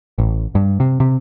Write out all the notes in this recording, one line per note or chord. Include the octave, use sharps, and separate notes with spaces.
A1
G2
C3
C3